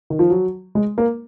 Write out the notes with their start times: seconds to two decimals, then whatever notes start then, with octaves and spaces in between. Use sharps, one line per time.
0.10 D#3
0.19 F3
0.30 F#3
0.75 G#3
0.98 A#3